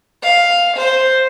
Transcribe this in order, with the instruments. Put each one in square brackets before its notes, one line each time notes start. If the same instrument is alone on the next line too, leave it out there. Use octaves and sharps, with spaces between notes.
[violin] F5
C5